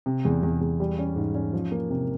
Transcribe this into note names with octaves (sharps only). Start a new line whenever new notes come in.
C3
E2
E2
E2
G3
C#4
G#2
C#4
F3
A#3
C3